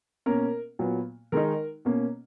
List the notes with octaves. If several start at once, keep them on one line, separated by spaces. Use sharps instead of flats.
B2 A#3 C#4 A#4
A#2 F#3 B3
D#3 G#3 D#4 A#4
B2 A#3 C#4